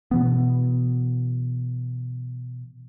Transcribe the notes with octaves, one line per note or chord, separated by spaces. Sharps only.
B2 E3 B3